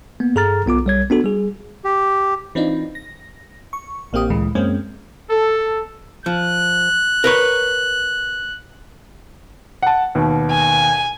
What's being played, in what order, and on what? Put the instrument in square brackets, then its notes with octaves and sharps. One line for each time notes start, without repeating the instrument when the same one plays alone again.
[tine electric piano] A#3 B3
G2 G#4 A4 A#5 F6 A6
B1 B3 F4 D6
B1 G3 C#5 G#6
B3 D4 F#4 A4
G3 G#4
[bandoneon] G4
[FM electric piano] E3 C4 D4 D#4 F4
A#6
C#6
A1 A#3 C4 G4 D#6
D2 A#2 E3 G#3
F#2 G#3 A#3 C4 C#4
[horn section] A4
[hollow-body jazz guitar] F3 [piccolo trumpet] F#6
[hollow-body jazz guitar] A#4 B4 C#5
[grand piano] F#5 A5
D#2 B2
[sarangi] G#5